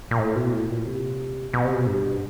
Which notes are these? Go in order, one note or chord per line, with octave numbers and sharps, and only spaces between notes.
A#2
A2
B2
A2
A#2
C3
B2
C3
B2
G2